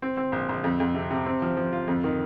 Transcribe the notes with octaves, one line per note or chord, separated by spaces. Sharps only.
C4
C4
A#1
A#1
F2
F2
C3
C3
C4
F3
F3
F4
F2
D#3